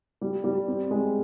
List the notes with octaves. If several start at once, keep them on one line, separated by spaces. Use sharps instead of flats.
G3
G3
C4
G#3